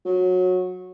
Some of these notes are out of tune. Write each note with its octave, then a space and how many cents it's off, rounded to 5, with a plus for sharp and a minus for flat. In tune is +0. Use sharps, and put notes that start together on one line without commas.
F#3 -20